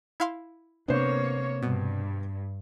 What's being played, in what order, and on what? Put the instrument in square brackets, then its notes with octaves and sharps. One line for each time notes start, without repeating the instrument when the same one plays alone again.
[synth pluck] E4 F5 C6
[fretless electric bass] C3 D4 [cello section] A#3 C#5 [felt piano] B3 C5
[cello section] G2 [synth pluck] B2